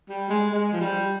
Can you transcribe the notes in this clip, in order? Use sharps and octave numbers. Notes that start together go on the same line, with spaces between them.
G3
G#3
G#3
F3
G3